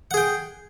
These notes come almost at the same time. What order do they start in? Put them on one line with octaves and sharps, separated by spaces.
F#5 G#4 G5